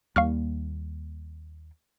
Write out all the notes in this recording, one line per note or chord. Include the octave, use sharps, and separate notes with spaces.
D#2 G3 A#3 F5 C#6 F6